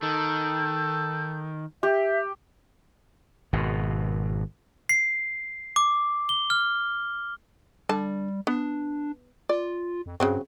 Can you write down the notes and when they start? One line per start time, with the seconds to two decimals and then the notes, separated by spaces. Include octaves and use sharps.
0.03 D#3 A4 G6
1.83 G4 E5
3.53 G#1 B2
4.89 C7
5.76 D6
6.29 G7
6.50 F6
7.89 D3 G3 A5
8.47 B3 D4
9.49 F4 D5
10.06 F2
10.20 G2 C#3 F#3 C4